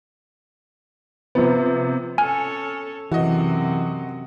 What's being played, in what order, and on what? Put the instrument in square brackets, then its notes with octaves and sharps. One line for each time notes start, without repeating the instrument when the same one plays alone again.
[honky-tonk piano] C3 F3 B3
[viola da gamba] C#4 A4 C#5 [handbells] G#5 [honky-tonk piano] F6
[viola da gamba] F#2 C3 [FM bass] E3 [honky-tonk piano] F#4 D#5